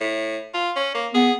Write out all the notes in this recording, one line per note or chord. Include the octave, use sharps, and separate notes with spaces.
A2
F4
C#4
A#3
B3 G#4